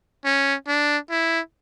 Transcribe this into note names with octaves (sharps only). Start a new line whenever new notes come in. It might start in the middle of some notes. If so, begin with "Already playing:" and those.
C#4
D4
E4